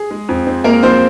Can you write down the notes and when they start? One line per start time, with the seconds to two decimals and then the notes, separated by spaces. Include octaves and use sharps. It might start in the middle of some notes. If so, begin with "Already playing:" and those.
Already playing: G#4
0.11 G#3
0.29 F2
0.47 C4
0.64 G#3 A#3 A#4
0.83 F3 C4 C5